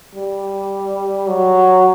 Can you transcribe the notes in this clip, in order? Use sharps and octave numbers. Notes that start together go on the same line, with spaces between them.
G3
F#3